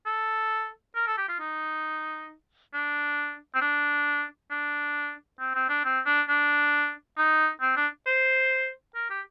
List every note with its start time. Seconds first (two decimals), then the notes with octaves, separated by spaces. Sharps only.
0.06 A4
0.96 A#4
1.07 A4
1.18 G4
1.29 F4
1.40 D#4
2.74 D4
3.54 C4
3.62 D4
4.51 D4
5.40 C4
5.55 C4
5.70 D4
5.85 C4
6.06 D4
6.29 D4
7.18 D#4
7.61 C4
7.77 D4
8.07 C5
8.95 A#4
9.10 G4